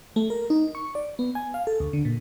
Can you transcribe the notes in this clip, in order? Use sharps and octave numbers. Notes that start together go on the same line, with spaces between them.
A3
A#4
D#4
C#6
D5
B3
G#5
F5
A4
D2
D3
A#2